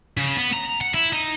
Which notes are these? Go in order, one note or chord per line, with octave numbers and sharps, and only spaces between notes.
C#3
B3
A#5
F#5
E4
D#4